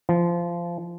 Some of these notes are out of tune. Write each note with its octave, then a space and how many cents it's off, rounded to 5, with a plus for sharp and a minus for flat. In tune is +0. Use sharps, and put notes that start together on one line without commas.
F3 -20